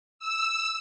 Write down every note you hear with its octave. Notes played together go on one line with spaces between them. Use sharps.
E6